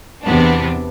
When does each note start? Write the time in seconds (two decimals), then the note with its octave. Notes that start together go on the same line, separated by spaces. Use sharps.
0.24 E2 C3 E3 B3 D4